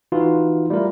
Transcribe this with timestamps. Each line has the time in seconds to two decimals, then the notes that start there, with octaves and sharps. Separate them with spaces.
0.12 E3 D#4 F4 F#4
0.70 G3 A3 E4 F4 A#4